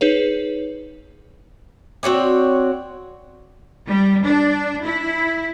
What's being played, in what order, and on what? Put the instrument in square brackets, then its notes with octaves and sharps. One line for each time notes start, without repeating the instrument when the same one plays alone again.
[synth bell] D#4 G#4 B4 C#5
[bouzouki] C4 F#4 C#5 D5
[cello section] G3
D4
E4